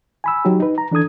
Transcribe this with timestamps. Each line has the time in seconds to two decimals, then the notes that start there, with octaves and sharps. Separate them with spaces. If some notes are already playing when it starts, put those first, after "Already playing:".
0.24 G#5 B5 E6
0.45 F#3 D#4 F#4 G4
0.60 D#4 B4
0.78 A#5
0.91 E3 D4 A4 D#6 G#6